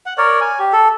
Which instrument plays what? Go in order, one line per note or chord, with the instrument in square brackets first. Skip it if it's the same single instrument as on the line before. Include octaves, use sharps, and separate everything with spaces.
[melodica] F#5
A#4 C#5 D5
G#5
G4
A4